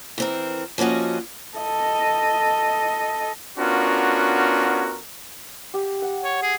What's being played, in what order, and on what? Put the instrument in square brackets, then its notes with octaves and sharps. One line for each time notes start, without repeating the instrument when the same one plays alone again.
[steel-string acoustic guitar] E3 C4 A#4
F3 A#3 C#4 F#4 D#5
[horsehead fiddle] A4 D#5
[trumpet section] B3 C#4 D4 F4 F#4 A#4
[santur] G4
F#5
[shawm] C#5
G#4